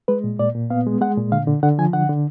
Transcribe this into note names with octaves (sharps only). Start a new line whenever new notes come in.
G#3 B4
A#2
A#2 D5
A#2
B3 F5
G#3
G#3 F#5
A#2
D3 F5
D3
D3 F#5
F3 G#5
D3 F#5
D3